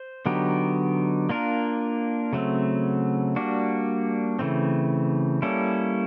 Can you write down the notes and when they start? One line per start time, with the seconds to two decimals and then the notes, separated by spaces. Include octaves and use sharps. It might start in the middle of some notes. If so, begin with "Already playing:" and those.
Already playing: C5
0.26 D3 F#3 B3 D#4 G4
1.29 A#3 D4 F4 A#4
2.33 C#3 F#3 A3 C4
3.36 G3 A#3 D4 F#4
4.39 C#3 E3 A3 C4
5.42 G3 A#3 C#4 E4 A4